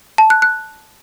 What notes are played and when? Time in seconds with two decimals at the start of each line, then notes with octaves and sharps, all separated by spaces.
0.18 A5
0.30 F#6
0.42 F#6